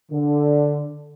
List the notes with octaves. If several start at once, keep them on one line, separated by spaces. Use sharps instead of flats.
D3